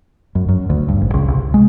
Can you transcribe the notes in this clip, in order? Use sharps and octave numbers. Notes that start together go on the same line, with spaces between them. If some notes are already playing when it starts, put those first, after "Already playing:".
F#2
F#2
D2
G2
A1
C#2
C2
G#3